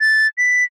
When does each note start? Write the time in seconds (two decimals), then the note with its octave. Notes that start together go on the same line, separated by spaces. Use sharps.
0.01 A6
0.38 B6